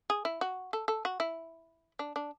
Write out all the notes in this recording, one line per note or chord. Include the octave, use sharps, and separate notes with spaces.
G#4
E4
F#4
A4
A4
F#4
E4
D4
D4